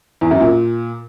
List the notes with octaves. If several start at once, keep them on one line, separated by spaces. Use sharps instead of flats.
E2
F#2
A#2